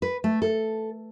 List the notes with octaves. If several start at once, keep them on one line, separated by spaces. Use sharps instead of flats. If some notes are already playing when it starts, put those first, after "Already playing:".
B4
A3
A4